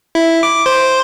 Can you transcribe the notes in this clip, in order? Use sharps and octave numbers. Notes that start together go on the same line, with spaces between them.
E4
D6
C5